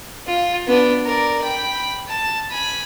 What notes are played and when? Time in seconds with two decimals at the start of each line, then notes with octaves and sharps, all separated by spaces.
0.27 F4
0.67 B3 D4
1.05 A#4 D5
1.42 G5 B5
2.09 A5
2.51 G#5 B5